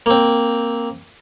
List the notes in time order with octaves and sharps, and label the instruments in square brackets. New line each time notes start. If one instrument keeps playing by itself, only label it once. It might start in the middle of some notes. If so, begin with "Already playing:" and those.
[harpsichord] A#3 C4